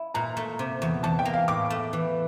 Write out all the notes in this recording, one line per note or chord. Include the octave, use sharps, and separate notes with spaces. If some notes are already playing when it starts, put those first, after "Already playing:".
Already playing: E4
A#2 A#5
A3
C3
E2
E2 A5
G5
A#3
F5
A2 D6
A3
E3